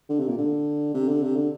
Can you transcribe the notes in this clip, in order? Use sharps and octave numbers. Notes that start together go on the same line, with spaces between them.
D3
C3
A#2
D3
C3
D3
C3
D3